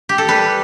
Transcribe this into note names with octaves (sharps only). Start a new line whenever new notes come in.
G4
A4
G3 B4